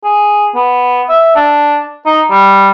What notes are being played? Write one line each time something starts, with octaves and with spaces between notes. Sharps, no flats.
G#4
B3
E5
D4
D#4
G3